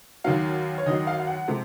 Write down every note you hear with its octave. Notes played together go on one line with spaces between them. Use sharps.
D#2 D#3 F#3 F5
C#5
D#2 D#3 F#3 D#5
F5
F5
F#5
C3 F3 G#3